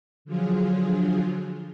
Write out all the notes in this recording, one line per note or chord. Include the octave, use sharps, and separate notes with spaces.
D3 F3 F#3 F4 G#4